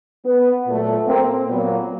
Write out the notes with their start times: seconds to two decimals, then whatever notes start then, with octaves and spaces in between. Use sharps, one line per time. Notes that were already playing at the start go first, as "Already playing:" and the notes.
0.25 B3
0.66 A#2 F#3 A3
1.07 A#3 C4
1.48 A#2 F#3 A#3 B3